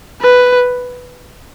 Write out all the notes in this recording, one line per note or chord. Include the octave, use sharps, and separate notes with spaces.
B4